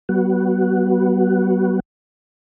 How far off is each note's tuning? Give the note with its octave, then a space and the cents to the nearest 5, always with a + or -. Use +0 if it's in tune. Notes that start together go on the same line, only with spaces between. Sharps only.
F#3 +45 B3 -15 F#4 +0